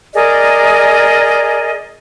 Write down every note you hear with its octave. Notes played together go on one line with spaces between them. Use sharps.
G#4 A#4 D5 D#5